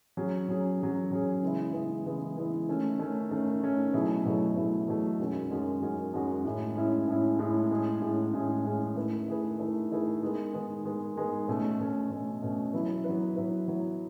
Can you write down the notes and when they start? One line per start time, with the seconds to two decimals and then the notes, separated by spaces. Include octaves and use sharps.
0.17 F#3 C#4 G#4
0.49 F#3 C#4 G#4
0.79 F#3 C#4 G#4
1.11 F#3 C#4 G#4
1.42 C#3 E3 G#3 B3 E4
1.73 C#3 E3 G#3 B3 E4
2.06 C#3 E3 G#3 B3 E4
2.36 C#3 E3 G#3 B3 E4
2.68 D#3 A3 C#4
2.99 D#3 A3 C#4
3.31 D#3 A3 C#4
3.62 D#3 A3 C#4
3.93 B2 F#3 A3 E4 G#4
4.25 B2 F#3 A3 E4 G#4
4.56 B2 F#3 A3 E4 G#4
4.88 B2 F#3 A3 E4 G#4
5.20 F#2 D#3 G#3 C#4 F#4
5.50 F#2 D#3 G#3 C#4 F#4
5.82 F#2 D#3 G#3 C#4 F#4
6.13 F#2 D#3 G#3 C#4 F#4
6.44 A2 G#3 C#4 E4
6.76 A2 G#3 C#4 E4
7.08 A2 G#3 C#4 E4
7.39 A2 G#3 C#4 E4
7.71 A2 G#3 C#4 G#4
8.02 A2 G#3 C#4 G#4
8.34 A2 G#3 C#4 G#4
8.65 A2 G#3 C#4 G#4
8.96 D#3 A3 E4 G#4 B4
9.28 D#3 A3 E4 G#4 B4
9.59 D#3 A3 E4 G#4 B4
9.91 D#3 A3 E4 G#4 B4
10.22 D#3 G#3 B3
10.53 D#3 G#3 B3
10.84 D#3 G#3 B3
11.16 D#3 G#3 B3
11.48 B2 A3 C#4
11.80 B2 A3 C#4
12.10 B2 A3 C#4
12.42 B2 A3 C#4
12.73 F#3 B3 E4 B4
13.04 F#3 B3 E4 B4
13.36 F#3 B3 E4 B4
13.67 F#3 B3 E4 B4